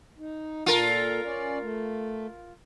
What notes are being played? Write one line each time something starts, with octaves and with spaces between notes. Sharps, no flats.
D#4
A#2 F4 A4 A#4
C#4 D5
A3